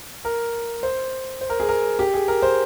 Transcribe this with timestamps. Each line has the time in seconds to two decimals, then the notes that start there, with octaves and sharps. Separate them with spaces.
0.25 A#4
0.83 C5
1.41 C5
1.50 A#4
1.60 G#4
1.69 A#4
1.99 G4
2.14 G#4
2.28 A#4
2.42 C5